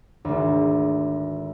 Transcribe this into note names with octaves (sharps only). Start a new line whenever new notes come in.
G#1 D2